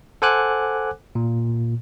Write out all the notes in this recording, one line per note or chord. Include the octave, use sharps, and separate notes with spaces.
A4 C5 F#5 G#5 D6 F#6
A#2